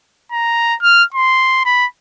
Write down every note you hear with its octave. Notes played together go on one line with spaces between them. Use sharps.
A#5
F6
C6
B5